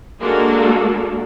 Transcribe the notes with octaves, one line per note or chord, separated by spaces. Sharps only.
G#3 A#3 D4 F#4 A4 A#4